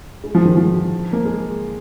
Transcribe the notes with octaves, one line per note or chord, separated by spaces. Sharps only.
G#3
F3
D#3
F3
A#3
G#3